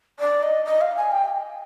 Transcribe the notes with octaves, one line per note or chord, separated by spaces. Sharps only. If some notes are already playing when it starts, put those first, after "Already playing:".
D5
D#5
D#5
F5
G#5
G5